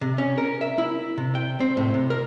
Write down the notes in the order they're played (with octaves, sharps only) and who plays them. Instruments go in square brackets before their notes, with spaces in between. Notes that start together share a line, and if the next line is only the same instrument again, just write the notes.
[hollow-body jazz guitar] C3
C#4
A#4
E5
E4
C3
G5
C4
A2
C3
A#4